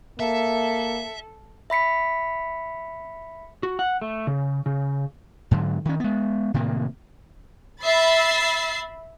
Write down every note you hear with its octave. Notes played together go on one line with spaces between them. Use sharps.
A#3 A4 E5
E5 B5 B6 C#7
F#4
F#5
A3
C#3
C#3
G#2 D3 F#3
D#3 C#4
G#3 B3
A2 C3 D#3 A#3
E5 B5 A6 C7